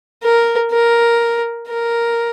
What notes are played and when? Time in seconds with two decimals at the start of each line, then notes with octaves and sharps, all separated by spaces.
0.23 A#4
0.72 A#4
1.68 A#4